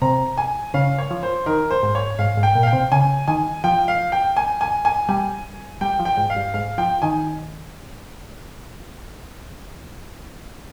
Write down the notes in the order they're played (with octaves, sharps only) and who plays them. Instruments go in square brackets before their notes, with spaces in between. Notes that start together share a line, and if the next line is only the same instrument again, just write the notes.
[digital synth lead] C3 [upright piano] A#5
[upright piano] G#5
[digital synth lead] C#3 [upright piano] F5
[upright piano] C#5
[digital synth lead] F3
[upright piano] C5
[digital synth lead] D#3 [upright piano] A#4
[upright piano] C5
[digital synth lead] G#2
[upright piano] C#5
[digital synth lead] G#2 [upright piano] F5
[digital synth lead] G#2
[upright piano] G5
[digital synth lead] A#2
[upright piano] F5
G5
[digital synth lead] C3
[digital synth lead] C#3 [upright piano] G#5
[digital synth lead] D#3 [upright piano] G#5
[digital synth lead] F3 [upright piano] G5
[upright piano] F5
G5
G#5
G#5
G#5
[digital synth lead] G3 [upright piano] G#5
[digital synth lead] G3 [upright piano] G5
[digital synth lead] F3
[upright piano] G5
[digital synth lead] G#2
[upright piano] F5
[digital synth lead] G2
[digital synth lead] G#2 [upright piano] F5
[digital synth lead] F3 [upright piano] G5
[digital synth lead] D#3 [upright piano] G#5